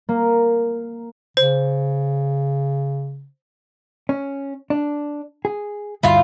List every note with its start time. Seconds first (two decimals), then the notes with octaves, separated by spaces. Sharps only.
0.09 A#3
1.37 C#3 C5
4.09 C#4
4.70 D4
5.45 G#4
6.03 D2 G2 E4 F4